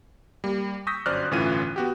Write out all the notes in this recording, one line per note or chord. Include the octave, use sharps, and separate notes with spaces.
G3 A#3
C#6 D#6 E6 G6 A#6 B6
G1 F#2 C5 D5 F6 F#6
G1 A2 E3 C#4 F4 D#7
B3 F#4 G4